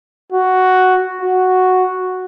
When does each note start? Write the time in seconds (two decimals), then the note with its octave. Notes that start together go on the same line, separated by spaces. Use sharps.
0.32 F#4
1.22 F#4